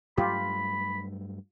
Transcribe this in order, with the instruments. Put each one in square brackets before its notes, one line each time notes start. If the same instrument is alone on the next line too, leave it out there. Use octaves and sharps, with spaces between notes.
[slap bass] G2 F#3 A3 [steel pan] F4 G4 [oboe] B5